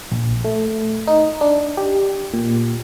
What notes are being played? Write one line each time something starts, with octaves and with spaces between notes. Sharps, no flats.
A#1
A3
D#4
D4
G4
A#2